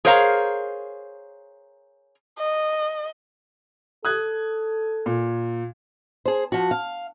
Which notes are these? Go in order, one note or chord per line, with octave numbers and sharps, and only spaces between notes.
G#4 A#4 C5 C#5 F5 A#5
D#5
A4 D#6 F#6 G#6
A#2
G#4 C5
F3 F#4
F5